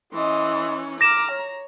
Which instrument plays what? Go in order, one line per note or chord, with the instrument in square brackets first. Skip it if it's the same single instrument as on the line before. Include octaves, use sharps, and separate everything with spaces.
[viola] E3 C#4 [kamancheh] D#5 C6
[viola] A#5 [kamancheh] D6 F6 [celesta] A#6 E7
[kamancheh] C#5